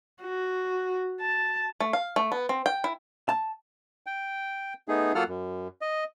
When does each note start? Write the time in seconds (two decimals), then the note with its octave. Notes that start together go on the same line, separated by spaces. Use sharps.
0.22 F#4
1.21 A5
1.80 A3
1.93 F5
2.16 A3
2.32 B3
2.49 C4
2.66 G5
2.84 E4
3.29 A5
4.07 G5
4.88 A3 B3 D#4 G#4
5.15 F#3 A#3 F4 A4 F#5 F6
5.28 F#2
5.81 D#5